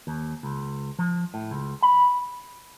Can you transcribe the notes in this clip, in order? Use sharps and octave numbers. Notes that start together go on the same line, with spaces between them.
D#2
C#2
F3
A2
C#2
B5